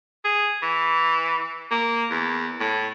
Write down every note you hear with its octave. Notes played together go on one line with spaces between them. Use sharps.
G#4
E3
A#3
E2
A2